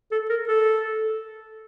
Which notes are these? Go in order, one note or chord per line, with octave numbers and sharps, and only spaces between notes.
A4
A#4
A4